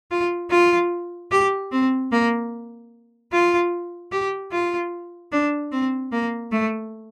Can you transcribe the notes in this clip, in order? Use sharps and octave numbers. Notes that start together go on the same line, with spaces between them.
F4
F4
G4
C4
A#3
F4
G4
F4
D4
C4
A#3
A3